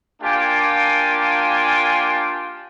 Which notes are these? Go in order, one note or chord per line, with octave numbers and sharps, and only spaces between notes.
A#3 D4 F4 G4 G#5